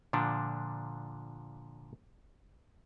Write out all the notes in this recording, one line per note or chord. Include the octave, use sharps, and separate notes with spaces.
A#2 D3 F3 D4